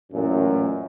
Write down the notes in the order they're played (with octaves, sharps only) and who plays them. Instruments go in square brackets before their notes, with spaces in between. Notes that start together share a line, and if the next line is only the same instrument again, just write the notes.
[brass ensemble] A1 F#2 A#2